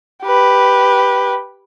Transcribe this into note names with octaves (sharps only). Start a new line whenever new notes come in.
G4 B4